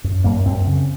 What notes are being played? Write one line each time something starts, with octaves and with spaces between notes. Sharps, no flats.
F#2
F#2 A#3
F#2 C4
C#3